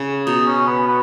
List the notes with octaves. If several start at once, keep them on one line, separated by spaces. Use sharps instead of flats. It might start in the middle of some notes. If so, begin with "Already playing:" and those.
Already playing: C#3
B2 D#4
C#4
B3
B3